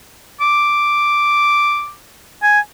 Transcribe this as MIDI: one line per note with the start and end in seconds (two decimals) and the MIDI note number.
0.41 1.91 86
2.43 2.60 80